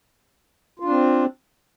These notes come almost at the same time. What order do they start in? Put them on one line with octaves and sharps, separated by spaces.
F4 D4 C4